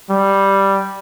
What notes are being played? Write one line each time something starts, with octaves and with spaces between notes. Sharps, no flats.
G3